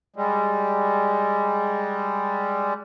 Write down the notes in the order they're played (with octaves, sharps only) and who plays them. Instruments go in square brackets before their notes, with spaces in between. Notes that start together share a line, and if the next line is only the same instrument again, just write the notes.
[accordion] G3 G#3